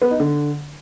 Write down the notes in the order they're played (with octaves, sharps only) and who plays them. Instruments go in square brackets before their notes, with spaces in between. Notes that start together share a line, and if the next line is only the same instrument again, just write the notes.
[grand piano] B3
D#4
D3